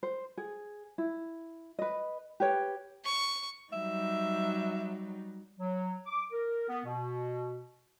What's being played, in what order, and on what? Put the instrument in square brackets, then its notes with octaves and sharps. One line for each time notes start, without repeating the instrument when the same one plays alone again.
[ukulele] C5
G#4
E4
B4 D#5
G4 B4 C#5 G5
[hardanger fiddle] C#6
[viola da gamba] F#3 G3 D#4 [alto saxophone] E5
[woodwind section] F#3
D6
A#4
B3
B2